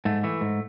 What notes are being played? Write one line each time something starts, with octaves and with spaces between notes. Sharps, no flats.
G#2 A3
E3 A3
G#2